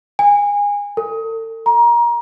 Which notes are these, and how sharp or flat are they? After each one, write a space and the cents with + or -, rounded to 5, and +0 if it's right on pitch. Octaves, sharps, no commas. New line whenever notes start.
G#5 -25
A4 +40
A#5 +25